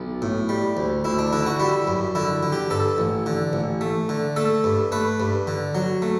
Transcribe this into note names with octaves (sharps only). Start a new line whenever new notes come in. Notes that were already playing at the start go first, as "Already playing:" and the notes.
Already playing: B1
A2
G3
D2
D2 E4
D4
D3 E4
F#4
G3 E4
F#2
D3 E4
D3
G4
G2 A4
A1
D3
A1
A3
D3
A3 A4
G2
A3 B4
G2
D3
F#3
A3